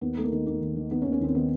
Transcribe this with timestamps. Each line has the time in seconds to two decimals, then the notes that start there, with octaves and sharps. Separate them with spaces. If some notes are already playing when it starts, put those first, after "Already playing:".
0.01 D#2 B3
0.17 D#3 A3
0.24 A#3
0.32 D#3
0.47 D#2 A#3
0.61 D#2
0.76 D#3
0.91 D#3 B3
1.02 C#4
1.05 D#2
1.12 C#4
1.20 D#2 C4
1.35 D#3 B3